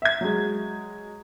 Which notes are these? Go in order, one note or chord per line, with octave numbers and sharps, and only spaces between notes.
E5 G#6
F#3 G#3